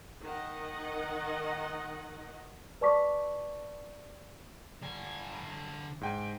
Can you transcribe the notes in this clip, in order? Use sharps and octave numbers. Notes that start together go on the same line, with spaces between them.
D#3 A#4 D#5 F#5
B4 D5 A5 C#6 D6 B6
D3 G#5
G#2 G5 G#5